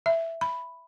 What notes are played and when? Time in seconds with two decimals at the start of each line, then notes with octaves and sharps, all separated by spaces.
0.06 E5
0.41 B5